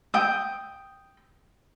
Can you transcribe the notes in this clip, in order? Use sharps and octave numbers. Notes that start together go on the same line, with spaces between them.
G5 D#6